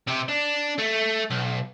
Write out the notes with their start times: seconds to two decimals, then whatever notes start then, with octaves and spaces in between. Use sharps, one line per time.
0.08 C3
0.28 D4
0.78 A3
1.30 B1